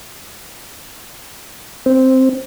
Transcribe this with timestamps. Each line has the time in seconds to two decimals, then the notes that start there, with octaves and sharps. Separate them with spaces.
1.86 C4